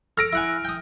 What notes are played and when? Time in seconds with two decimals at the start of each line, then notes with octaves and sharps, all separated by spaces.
0.17 A4 F6 A#6 D7
0.33 E4 F#5 G#5
0.65 G5 D#6